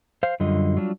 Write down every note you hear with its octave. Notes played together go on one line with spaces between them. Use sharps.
C5 F5
F#2 D3 G3 F4 D#5
F#3 G3 D4 F4